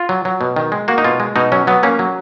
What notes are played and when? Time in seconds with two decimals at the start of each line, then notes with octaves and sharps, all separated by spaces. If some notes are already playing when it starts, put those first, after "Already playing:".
Already playing: F4
0.09 F#3
0.25 F#3
0.41 B2
0.56 D#3
0.72 G#3
0.88 A#3 F#4
0.98 D#4
1.04 B2 F4
1.20 G#3
1.36 B2 D#4
1.52 F#3 C#4
1.67 F#3 B3
1.83 A#3 C#4
1.99 F#3